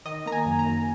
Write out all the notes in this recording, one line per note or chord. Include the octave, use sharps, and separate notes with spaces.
D#3 D#5
A#3 A#5
G#5
F#2
A#5
F#2